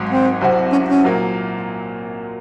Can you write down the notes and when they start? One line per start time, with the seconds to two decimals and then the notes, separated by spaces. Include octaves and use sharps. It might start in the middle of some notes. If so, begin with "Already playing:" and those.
Already playing: G#1 G#2 F#3
0.09 C4
0.41 C2 C3 F#3 C4 F#4
0.72 C#4
0.89 C#4
1.04 A#2 F#3 A#3